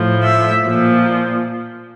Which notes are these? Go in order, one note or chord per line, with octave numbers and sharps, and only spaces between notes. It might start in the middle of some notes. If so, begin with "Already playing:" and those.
Already playing: A2 F3
E5
A#2 F3